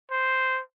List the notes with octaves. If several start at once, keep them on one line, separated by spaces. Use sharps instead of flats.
C5